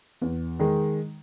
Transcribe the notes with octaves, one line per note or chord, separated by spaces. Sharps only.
E2
D#3 G#3